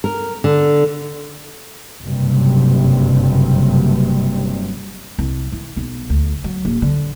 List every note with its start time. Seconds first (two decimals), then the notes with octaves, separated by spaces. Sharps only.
0.04 A#4
0.44 D3
2.01 F#1 G2 C3
5.18 C2
5.52 E3
5.77 B1
6.10 D2
6.44 F#3
6.65 D#1
6.82 D3